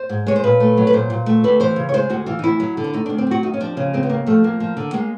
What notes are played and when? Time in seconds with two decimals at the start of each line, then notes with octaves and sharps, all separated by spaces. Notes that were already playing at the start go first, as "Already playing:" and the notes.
Already playing: C5
0.09 G#2
0.27 G#3 C#5
0.36 C5
0.43 A#2 B4
0.60 A3
0.77 F#3
0.87 B4
0.93 A#2 C5
1.10 A#2
1.26 A3
1.44 D2 B4
1.60 E3 C5
1.76 C#3
1.89 C#5
1.94 G#3 C5
2.10 D2 F#4
2.26 E3 F4
2.39 D#4
2.43 D2 E4
2.60 F#3
2.77 D3
2.84 D4
2.93 A3 D#4
3.06 D2 D4
3.18 C4
3.27 F#3 F#4
3.43 D#2 D#4
3.53 C#4
3.60 F3 D4
3.77 C#3 C#4
3.93 G#3 C4
4.03 B3
4.09 D#2 A#3
4.26 F3 A3
4.44 F2 A#3
4.60 F3
4.77 D3
4.93 G#3 A#3